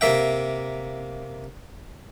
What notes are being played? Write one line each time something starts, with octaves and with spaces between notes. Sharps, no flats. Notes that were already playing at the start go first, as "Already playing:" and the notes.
C3 A#3 E5 G5